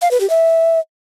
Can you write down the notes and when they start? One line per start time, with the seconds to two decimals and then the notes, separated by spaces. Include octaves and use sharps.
0.02 F5
0.11 B4
0.20 G4
0.30 E5